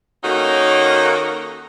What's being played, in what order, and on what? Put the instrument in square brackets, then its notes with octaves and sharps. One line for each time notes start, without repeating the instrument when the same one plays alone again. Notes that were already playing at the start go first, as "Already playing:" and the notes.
[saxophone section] D#3 A#3 C#4 D#4 F#4 A4